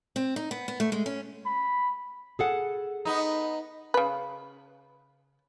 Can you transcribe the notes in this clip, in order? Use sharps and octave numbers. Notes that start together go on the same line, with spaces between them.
C4
D#4
B3
B3
A3
G#3
C#4
B5
G#4 A4 F#5
B3 D#4
C#3 B4